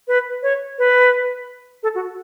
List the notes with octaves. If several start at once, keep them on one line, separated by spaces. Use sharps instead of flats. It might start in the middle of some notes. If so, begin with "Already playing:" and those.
B4
C#5
B4
A4
F#4